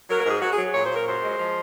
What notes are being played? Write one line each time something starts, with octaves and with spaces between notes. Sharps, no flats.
F#3 A#4
A#4
G#2
G#4
F#3 F#4
G#4
F#3
A#2 C#5
C5
A#2
A#4
F#2 C5
G#3
F3